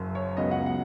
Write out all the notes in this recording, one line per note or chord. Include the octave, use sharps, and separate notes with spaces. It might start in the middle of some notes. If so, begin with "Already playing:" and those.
Already playing: F#1 F#2 F#3
C#5
C#2 C#3 F#3 B3 D#5
F#5
F#5